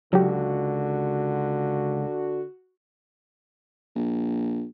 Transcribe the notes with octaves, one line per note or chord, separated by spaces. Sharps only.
C#2 D3 F#3 F#4 G4
A#1